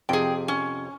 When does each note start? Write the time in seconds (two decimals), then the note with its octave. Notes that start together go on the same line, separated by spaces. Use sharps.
0.09 F2 C3 G#4 G5
0.48 C#4